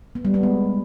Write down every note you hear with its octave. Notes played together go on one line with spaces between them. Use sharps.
B3
G3
B3
G#3